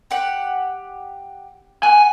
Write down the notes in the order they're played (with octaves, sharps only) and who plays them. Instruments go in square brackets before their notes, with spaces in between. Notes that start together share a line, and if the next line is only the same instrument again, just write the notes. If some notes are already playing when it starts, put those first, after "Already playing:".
[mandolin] G4 F#5
[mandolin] F#5 [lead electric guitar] G#5